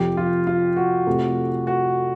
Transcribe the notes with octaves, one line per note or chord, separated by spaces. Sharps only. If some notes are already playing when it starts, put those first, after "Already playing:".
Already playing: F2 C3 F3 G4
F4
F4
F#4
F2 C3 F3 A3 C4
F#4